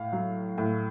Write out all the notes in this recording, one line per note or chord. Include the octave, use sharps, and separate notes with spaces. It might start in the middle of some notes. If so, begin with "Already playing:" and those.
Already playing: A2 F5
F#3
A2